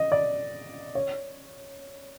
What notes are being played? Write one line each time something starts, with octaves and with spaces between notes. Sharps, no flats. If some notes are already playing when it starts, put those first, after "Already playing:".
Already playing: D#5
D5
C#5